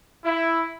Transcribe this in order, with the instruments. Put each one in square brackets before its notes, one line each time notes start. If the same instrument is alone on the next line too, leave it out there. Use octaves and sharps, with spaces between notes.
[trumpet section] E4